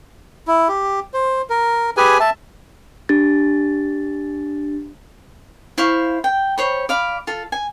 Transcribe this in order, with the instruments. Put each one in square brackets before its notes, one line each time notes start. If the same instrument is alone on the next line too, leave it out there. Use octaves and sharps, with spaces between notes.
[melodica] E4
G4
C5
A#4
G4 G#4 B4 G#5
E5 A5
[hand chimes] D4 G4 A6
[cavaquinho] E4 C5 F5 C#6
G5
C5 C#5 B5
D5 F5 B5
F4 A4
G#5